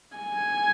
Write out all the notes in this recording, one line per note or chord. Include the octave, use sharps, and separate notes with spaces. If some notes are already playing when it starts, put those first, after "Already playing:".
G#5